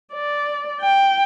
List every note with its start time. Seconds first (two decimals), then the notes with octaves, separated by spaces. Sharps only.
0.13 D5
0.81 G5